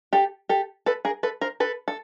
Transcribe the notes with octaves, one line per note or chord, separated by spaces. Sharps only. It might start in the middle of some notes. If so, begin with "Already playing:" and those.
G4 A4
G4 A4
A4 B4
G#4 A#4
A4 B4
A#4 C5
A4 B4
A4